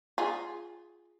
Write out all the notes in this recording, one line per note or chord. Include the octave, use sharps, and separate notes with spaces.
F4 G#4